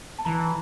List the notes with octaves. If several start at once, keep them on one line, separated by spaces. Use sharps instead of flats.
A5
E3 A#5